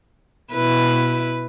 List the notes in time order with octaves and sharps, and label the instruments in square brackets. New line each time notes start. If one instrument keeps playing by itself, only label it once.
[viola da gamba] B2 E4 B4